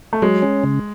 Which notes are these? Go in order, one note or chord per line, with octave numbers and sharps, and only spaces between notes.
A3
F#3 G#3
C#4
C#3